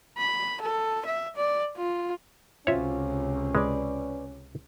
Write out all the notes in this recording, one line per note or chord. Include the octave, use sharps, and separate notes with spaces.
B5
A4
E5
D5
F4
C#2 C3 C#4 F4 F#4 C5 C#5 E5
G#3 B4 D5